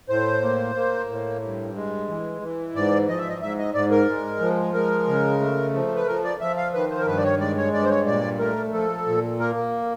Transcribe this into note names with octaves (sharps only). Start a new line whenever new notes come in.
A2 C5
A#3
A#3
A2
G2
G#3
E3
E3
G#2 D5
F3 D#5
E5
D#5
G#2 E5
D#5
G#2 D5
A#4
G#3
F3
G#3 A#4
C#3
A3
F3
B4
F3 A#4
D5
F3 E5
F5
D#3 B4
C5
A#4
G2 B4
D5
C#5
G#3 D5
C#5
G2 D5
C5
C#5
A#2 D5
A3 A#4
F3 A4
A#2
A#3 A#4